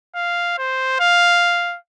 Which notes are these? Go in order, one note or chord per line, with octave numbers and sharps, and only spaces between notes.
F5
C5
F5